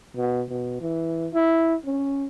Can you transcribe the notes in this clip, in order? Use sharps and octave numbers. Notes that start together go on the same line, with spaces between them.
B2
B2
E3
E4
C#4